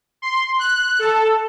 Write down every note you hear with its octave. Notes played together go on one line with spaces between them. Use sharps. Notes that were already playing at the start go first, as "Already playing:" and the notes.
C6
F#6
A4